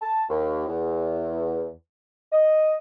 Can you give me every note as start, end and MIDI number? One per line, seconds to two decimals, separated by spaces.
0.02 0.24 81
0.30 0.66 39
0.67 1.70 40
2.33 2.76 75